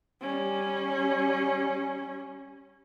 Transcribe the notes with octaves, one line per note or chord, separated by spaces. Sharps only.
G3 C#4